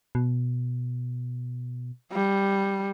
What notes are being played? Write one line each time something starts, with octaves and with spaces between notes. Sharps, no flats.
B2
G3